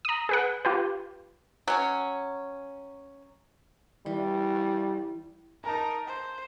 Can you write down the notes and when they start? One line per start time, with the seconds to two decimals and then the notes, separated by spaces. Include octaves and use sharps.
0.05 A#5 D#6
0.29 G#4 B4 F#5
0.65 F4 G4 B4
1.67 F#3 C#4
4.06 E3 G3
5.64 D#4 A#4 A5 A#5
6.07 C5